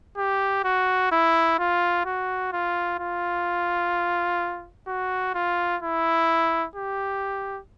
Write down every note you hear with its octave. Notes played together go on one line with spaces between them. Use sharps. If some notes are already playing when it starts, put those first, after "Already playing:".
G4
F#4
E4
F4
F#4
F4
F4
F#4
F4
E4
G4